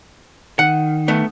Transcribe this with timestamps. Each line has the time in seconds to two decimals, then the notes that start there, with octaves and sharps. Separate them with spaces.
0.59 D#3 F#5
1.08 A3 B3